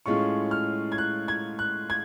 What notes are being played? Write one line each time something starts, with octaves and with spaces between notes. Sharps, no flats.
A2 G#3 C#4 F4 C#6
F6
G#6
F#6
G#6
F#6
G#6